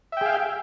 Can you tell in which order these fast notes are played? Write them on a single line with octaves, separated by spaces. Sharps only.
E5 G5 G#4 F5